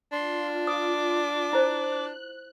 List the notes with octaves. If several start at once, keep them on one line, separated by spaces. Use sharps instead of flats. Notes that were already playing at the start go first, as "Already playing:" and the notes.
D4 F4 C6
D6 D#6
E4 C5 F#6